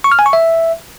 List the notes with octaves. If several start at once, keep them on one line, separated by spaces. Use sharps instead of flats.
C#6
F6
G#5
C#6
E5